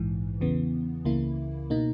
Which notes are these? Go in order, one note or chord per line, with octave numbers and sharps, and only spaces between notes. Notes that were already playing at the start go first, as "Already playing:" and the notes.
Already playing: A#1 G#2 E3
E2 C#3 E3 B3
C#2 C#3 E3 A#3 E4
B2 A#3 D#4